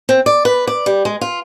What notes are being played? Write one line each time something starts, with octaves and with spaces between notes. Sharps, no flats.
C4
D5
B4
D5
G3
G#3
F4